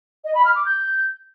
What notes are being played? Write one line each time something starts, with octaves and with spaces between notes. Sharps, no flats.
D#5
B5
F6
D6
G6